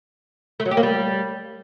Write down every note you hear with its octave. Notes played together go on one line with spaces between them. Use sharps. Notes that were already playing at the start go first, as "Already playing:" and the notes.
A3
F#3
G4
A#3
G3